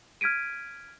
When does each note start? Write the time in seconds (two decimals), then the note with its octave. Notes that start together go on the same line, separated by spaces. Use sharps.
0.21 F6 G#6 B6 D7 D#7